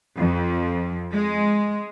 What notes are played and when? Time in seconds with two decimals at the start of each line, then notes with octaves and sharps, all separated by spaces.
0.17 F2
1.11 G#3